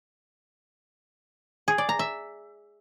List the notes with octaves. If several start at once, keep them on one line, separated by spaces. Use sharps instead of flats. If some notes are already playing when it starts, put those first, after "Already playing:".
G#4
D5
A#5
E5